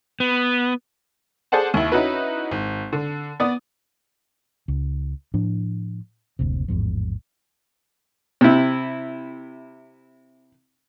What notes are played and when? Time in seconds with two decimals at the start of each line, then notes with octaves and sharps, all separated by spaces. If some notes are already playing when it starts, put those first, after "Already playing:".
0.20 B3
1.52 G#4 A4 C5 D5 F#5 A5
1.74 D#2 E4
1.92 C#4 D#4 E4 F#4 B4
2.51 G#1
2.93 D3
3.40 B3 D5 D#6
4.68 C#2
5.34 A2 F3 D4
6.39 F#1 D2 C3
6.68 A1 E2 G#2 F3
8.41 C3 E4